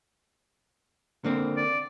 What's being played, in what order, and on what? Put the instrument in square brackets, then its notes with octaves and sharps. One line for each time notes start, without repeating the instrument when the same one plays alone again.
[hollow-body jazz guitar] D3 A#3 C4
[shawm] D5